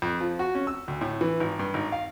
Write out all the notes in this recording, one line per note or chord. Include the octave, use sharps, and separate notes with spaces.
F2
F3
F#4
C#4
E6
D2
A2
E3
G#1
G2
G#1
F5